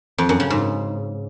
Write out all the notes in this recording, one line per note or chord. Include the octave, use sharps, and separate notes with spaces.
F2
F#2
C#3
G#2